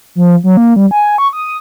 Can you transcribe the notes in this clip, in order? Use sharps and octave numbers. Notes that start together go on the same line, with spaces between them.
F3
F#3
A#3
G3
G#5
C#6
D#6